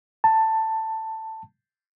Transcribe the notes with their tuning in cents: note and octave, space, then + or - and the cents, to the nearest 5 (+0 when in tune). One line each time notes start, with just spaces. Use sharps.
A5 +10